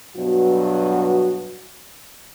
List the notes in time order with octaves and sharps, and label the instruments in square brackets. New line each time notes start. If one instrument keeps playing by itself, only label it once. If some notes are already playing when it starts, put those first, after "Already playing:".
[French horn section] G2 B2 F#3 B3 F#4